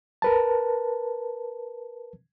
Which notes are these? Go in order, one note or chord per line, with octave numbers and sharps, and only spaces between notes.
A#4 B4 A5